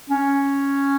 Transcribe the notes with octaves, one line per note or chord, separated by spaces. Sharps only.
C#4